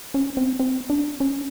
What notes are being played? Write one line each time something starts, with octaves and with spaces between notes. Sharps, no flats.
C#4
C4
C4
D4
C#4